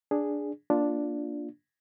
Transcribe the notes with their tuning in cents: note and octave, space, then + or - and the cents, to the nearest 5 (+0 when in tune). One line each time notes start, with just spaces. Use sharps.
D4 +0 G#4 -5
A#3 +5 D4 +0 F4 +0